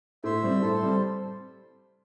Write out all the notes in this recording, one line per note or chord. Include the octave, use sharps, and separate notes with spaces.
A2 C5 E5
G3 C4
A2 A4 C5
G3 C4